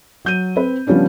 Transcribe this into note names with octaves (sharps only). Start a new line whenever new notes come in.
F#3 G6 D#7
C4 B4
C#3 F3 G3 B3 C#4 D4